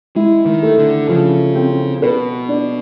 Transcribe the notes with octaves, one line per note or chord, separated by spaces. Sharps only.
G#3 E4
D#3
A3
D3
C#3 F3
C4
B2 B4
D4